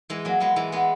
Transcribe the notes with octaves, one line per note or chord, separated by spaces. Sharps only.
E3 G#3
F#3 A#3
G#3 B3
E3 G#3
G#3 B3